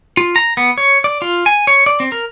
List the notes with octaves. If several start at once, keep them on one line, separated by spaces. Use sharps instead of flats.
F4
A#5
B3
C#5
D5
F4
G#5
C#5
D5
C4
A#4